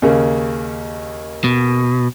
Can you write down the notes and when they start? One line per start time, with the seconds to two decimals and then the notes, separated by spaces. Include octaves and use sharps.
0.02 D#2 C#3 A#3
1.44 B2